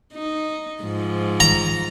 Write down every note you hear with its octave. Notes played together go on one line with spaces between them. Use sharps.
D#4
G#2 F3
A#5